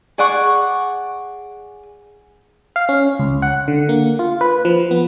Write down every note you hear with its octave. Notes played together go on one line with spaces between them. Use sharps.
G#4 D5 F#5 C#6
F5
C#4
C#2
F#5
D3
A#3
F4
B4
F3
B3